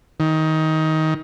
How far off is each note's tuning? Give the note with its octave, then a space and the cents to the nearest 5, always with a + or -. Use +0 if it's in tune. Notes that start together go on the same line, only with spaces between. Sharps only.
D#3 +20